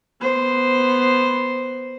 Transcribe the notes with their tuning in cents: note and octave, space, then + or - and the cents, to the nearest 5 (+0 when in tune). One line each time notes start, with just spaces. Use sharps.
B3 +0 C5 +0